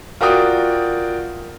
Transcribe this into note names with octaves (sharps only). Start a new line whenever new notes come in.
F4 F#4 A#4 D5 G5 D#6